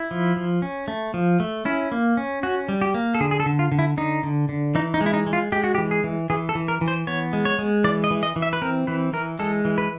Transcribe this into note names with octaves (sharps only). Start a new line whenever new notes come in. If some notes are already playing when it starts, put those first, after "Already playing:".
Already playing: E4
F3
F3
C#4
A3
F3
A3
C#4 E4
A#3
C#4
C#4 F#4
G3
G4
A#3
A4
D3 G#4
G#4
A4
D3
F4
D3
E4
D3 D#4
D3
D3
E3 D#4
D#4
G#3
E4
D#4
G#3
F4
G#3 G4
F#4
G4
E3
G#4
E3
E3 G#4
A4
E3
A#4
E3
C5
B3 C#5
G#3
C#5
G#3
E3 D5
D#5
E3
D#5
E3
E5
B4
C4 A#4
E3 B4
E3 A#4
G#3 A4
E3
B4